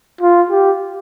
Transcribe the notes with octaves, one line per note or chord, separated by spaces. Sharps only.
F4
G4